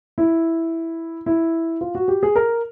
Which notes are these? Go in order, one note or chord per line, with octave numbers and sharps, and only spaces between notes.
E4
E4
F4
F#4
G4
G#4
A#4